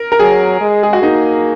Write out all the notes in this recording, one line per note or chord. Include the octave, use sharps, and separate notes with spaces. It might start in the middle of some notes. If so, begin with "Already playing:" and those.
Already playing: A#4
A#4
F#3 G#4
G#3
G#4
F#4
A#3 D#4